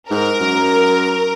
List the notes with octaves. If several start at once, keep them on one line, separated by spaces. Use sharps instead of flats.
G#2 A#4
F#2